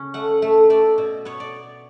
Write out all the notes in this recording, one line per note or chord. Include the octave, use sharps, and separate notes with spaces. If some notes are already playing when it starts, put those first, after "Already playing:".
Already playing: C#3 C#4
A3 F#5
A3
A3 D5
B2
B3 C#5
D5